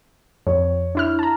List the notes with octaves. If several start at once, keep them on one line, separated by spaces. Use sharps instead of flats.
F2 C#5
D4 E4 F6
A5 A#5